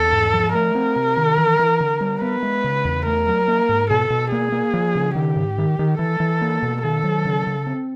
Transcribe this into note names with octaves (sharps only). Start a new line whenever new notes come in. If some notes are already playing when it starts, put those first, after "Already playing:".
Already playing: E2 A4
G#2
F3
A3 A#4
C4
C3
D#3
E3
E3
D3
G3
B3 B4
G#3
C#3
E2
A3 A#4
F#3
A#3
G#2
B2 A4
B2
A#3 G#4
A#3
F3
C#3
D#3 G4
G#2
D#3
D#3
E3 A4
E3
A#3
B2
D#3 A4
F#3
C#3
C#3
C4